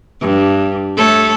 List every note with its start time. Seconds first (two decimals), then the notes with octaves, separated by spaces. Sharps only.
0.21 G2
0.95 A3 A4 C#5